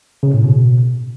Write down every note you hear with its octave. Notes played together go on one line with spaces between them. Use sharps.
C#3
A2
B2